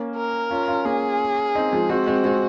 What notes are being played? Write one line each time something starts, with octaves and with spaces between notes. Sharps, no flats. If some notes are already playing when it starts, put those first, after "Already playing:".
Already playing: A#3 C#4
A#4
C#4 F4
C#4 F4
A#3 C#4 G#4
C4 D#4
F3 G#3
G#3 C4 F#4
G#3 C4
G#3 C4